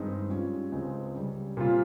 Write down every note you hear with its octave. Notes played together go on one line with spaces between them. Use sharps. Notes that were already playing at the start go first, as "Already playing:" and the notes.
Already playing: G2 D#3 G#3 C4 D#4
G#2 G3 C#4 F4
C#2 C#3 G#3 C4
C#3 G3 C#4
A#2 G3 C4 F4